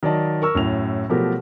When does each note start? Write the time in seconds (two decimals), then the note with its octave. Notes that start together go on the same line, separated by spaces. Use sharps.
0.03 D#3 F#3 D5 D#5 A5
0.42 A#4 C#6 E6
0.55 F#2 A2 F7
1.09 B2 F3 F#3 A3 G4 A#4